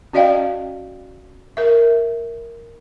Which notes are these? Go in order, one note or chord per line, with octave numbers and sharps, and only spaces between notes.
C#4 F#4 D5 D#5 F5 G5
A#4 E5